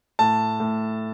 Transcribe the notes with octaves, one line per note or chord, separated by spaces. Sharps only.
A2 A5
A2